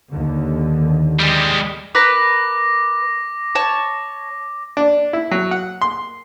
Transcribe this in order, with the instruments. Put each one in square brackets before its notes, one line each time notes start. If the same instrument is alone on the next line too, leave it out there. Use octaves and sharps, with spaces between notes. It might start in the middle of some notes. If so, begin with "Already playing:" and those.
[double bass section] D#2 D3
[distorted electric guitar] G3 G#3
[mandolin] A#4 B4 B5 [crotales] D6 A#6
[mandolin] C#5 A5
[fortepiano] D4
E4
F#3
F#5
C6